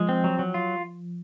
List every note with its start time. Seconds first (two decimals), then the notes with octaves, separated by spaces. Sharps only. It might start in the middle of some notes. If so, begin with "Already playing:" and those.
Already playing: F3 G#3
0.09 C4
0.24 F#3
0.39 F#3
0.54 F4